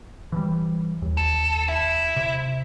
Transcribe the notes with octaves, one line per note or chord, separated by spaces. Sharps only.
E3 F3 G3
D#2
A4
E4
C3